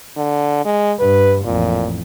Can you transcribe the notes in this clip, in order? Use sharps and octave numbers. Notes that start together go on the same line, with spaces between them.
D3
G#3
G2 B4
A1 F2 A#2